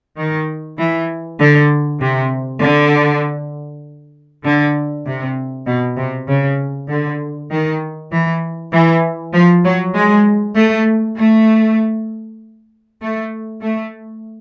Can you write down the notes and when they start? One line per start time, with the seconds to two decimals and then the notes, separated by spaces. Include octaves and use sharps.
0.17 D#3
0.78 E3
1.39 D3
2.00 C3
2.61 D3
4.44 D3
5.06 C3
5.67 B2
5.97 C3
6.28 C#3
6.89 D3
7.51 D#3
8.11 E3
8.72 E3
9.33 F3
9.64 F#3
9.95 G#3
10.56 A3
11.17 A3
13.01 A3
13.61 A3